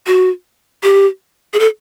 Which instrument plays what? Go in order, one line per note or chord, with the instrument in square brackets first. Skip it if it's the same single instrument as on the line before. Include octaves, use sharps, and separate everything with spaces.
[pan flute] F#4
G4
G#4
A4